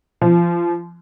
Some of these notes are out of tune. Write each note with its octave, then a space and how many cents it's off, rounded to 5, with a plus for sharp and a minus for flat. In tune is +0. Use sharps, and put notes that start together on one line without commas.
F3 -25